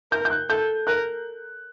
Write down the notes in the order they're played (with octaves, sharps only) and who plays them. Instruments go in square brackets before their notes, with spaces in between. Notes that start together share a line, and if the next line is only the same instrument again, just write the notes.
[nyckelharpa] A#4 [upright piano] G6
[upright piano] G6
F#6
[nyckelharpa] A4 [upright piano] G6
[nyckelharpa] A#4 [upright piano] F#6